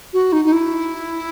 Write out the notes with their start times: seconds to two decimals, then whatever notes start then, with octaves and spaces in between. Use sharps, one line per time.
0.13 F#4
0.33 D#4
0.45 D#4
0.53 E4